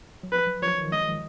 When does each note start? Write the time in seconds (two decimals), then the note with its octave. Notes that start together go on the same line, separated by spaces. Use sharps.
0.23 F#3
0.32 F3 B4
0.47 F#3
0.62 F3 C#5
0.78 D#3
0.92 G#3 D#5